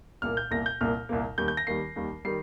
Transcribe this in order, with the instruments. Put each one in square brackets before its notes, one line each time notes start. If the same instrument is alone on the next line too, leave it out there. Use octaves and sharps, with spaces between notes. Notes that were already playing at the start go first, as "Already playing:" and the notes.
[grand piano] C2 A#2 A#3 F6
G6
C2 A#2 A#3 A#6
G6
C2 A#2 A#3 F6
C2 A#2 A#3
D#2 D#3 G3 G6
G6
A#6
D#2 D#3 G3 C7
D#2 D#3 G3
D#3 G3 C7